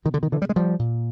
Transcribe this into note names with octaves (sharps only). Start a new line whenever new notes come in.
B2 D#3
D3
D#3
D3 E3
G3
G#3
F3 G3
A#2